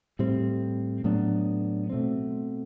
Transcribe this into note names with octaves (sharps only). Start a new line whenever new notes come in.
A2 G3 C4
A2 F#3 B3 D4
B2 A3 C4